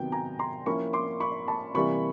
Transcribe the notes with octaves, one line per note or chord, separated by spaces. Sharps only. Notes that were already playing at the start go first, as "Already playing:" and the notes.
Already playing: C3 D#3 F#3 B3 G5
G#5 A#5
A#5 C6
F3 A#3 C#4 E4 B5 C#6
C6 D6
B5 C#6
A5 B5
C3 E3 G3 A#3 B5 C#6